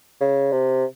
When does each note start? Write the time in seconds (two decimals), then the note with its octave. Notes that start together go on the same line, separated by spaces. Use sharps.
0.21 C#3
0.52 C3